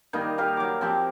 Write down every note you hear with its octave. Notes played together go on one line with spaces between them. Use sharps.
D#3 G3 A#3 D#4
G4 A#4 F5 A#5
F#3 D6
F3 C4 G4